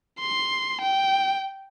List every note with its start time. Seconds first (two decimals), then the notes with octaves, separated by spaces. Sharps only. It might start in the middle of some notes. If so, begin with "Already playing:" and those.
0.20 C6
0.81 G5